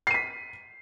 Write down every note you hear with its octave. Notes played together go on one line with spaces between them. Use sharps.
B6 C7 D#7